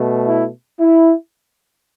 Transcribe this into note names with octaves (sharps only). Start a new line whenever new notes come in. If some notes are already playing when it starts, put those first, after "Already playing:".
Already playing: B2 A3
E4
E4